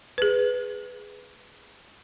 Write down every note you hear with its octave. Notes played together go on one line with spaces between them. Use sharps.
G#4 B4